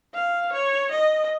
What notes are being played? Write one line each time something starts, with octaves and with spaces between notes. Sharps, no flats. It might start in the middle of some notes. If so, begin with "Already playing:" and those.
F5
C#5
D#5